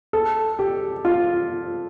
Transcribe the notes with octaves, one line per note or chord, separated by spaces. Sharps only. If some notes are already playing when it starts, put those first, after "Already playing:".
A4
G4
F4